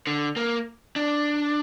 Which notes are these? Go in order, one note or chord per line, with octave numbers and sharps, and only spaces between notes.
D3
A#3
D4